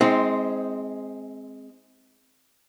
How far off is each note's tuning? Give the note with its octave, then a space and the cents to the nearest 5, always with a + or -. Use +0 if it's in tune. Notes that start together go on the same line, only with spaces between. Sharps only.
G#3 +0 C4 +0 D#4 +45